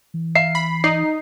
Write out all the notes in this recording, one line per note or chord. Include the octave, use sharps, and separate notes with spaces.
E3
E5 F5 A#5 C7
B5
D#4 D5 C7